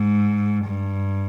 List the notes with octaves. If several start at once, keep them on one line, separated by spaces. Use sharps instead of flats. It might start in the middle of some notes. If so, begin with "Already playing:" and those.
Already playing: G#2
G2